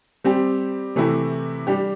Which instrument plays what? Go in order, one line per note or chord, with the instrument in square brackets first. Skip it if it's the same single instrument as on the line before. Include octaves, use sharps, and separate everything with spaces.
[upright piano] G3 C4 G4
C3 E3 A3 E4 G4
G3 D4 G4